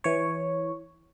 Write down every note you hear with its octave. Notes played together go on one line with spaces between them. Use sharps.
E3 C#5